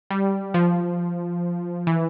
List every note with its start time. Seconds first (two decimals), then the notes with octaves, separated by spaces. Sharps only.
0.10 G3
0.54 F3
1.87 E3